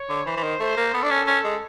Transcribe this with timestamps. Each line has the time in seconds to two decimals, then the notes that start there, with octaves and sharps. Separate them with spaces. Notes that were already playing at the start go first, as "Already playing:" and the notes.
Already playing: C#5
0.09 D3
0.26 E3 C5
0.37 E3
0.43 D#3
0.60 A3 C5
0.77 A#3
0.94 B3 A4
1.03 D4
1.10 C#4
1.27 C#4
1.44 G#3